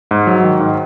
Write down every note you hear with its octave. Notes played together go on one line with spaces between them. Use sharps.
G#2
F#3
D#3
G#2